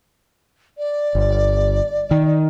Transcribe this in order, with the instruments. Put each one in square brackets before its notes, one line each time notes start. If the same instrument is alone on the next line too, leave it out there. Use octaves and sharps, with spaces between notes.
[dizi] D5
[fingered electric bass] G1
D#3